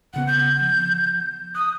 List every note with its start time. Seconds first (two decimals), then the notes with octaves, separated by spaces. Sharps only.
0.14 G1 C#3 B3 F#5
0.27 G6
0.61 F3
1.55 D#6 F#6